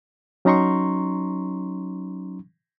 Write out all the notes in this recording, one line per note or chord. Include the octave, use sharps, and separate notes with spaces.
F#3 C#4 D#4 A#5 C6 C#6